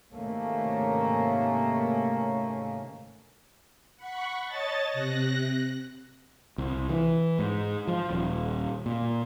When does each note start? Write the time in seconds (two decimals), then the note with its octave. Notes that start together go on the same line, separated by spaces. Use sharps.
0.13 G#2 C3 D#3 A3 A#3 C#4
3.96 F#5 B5 C#6
4.46 C#5 D#5 A5 A6
4.90 C3 F#6 A#6
6.58 C2
6.89 E3
7.39 G#2
7.88 F3
8.10 D#1
8.86 A#2